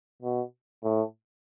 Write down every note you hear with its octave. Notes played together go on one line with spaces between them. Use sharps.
B2
A2